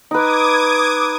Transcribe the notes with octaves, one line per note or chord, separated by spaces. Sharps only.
D#4 B4 D6 D#6 G#6